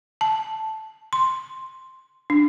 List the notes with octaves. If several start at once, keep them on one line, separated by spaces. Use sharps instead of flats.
A5
C6
D4